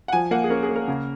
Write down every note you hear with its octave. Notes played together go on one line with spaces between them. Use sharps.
F#5
F3 G#5
A#3 F#5
G#4
C#4 A#4
G#4
A#3
A#4
C#3